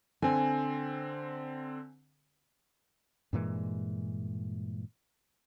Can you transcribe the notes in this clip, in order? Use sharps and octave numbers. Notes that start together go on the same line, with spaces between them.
D3 C4 G#5
G2 A#2 E3 G#3